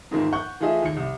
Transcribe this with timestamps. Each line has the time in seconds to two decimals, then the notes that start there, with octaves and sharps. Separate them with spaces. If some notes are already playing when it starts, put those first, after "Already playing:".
0.11 F2 G#2 D#3 E3 A#3 C4
0.33 F#5 C#6 G6
0.60 E3 A3 F4 G#4 D#5 E5
0.82 D#2 C#7
0.97 C2